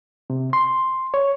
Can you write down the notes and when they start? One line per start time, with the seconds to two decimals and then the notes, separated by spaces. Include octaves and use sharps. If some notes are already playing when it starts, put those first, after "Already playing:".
0.30 C3
0.53 C6
1.14 C#5